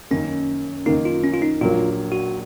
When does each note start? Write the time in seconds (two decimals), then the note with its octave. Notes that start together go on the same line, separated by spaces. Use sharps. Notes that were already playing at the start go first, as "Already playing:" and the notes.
0.11 F#2 D#3 A#3 C#4
0.86 F#2 D#3 A#3 D#4
1.05 F4
1.24 C#4
1.34 F4
1.42 D#4
1.61 A#1 A#2 F#3 A#3 F4
2.12 F#4